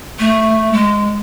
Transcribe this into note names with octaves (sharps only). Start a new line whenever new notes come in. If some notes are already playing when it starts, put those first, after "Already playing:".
A3
G#3